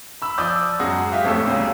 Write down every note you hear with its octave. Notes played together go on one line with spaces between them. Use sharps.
B5 E6
F3 D5 D#6 E6 G6
F#2 G#3 F#4 D#6
F4 G4 E5
G#1 F2 A2 A4 E6
D2 A#2 C#3 F#3 G3